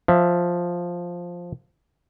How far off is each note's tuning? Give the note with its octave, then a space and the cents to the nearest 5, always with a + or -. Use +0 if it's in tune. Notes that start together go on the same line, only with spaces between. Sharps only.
F3 +5 E5 +10